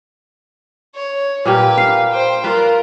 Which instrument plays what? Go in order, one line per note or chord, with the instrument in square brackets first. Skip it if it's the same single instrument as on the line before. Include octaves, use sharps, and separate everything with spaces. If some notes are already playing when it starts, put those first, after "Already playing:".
[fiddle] C#5
[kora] A#2 A#3 G4 [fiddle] B4
[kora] F5
[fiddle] C5 G5
[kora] F4 B4 D5 [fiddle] A#4